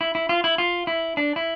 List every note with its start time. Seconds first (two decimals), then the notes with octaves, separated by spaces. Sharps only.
0.01 E4
0.15 E4
0.29 F4
0.44 E4
0.58 F4
0.87 E4
1.17 D4
1.36 E4